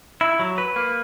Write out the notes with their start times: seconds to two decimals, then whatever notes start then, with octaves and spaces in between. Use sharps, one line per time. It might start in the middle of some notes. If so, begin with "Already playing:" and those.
0.21 E4
0.40 F#3
0.58 B4
0.76 A#3